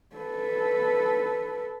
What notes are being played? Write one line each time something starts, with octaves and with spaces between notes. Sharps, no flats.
A4 B4